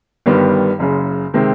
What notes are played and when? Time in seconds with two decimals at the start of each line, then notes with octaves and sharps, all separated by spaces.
0.26 G1 G2 D#3 G3 B3
0.79 F#1 F#2 C#3
1.34 C3 D#3 G#3 C4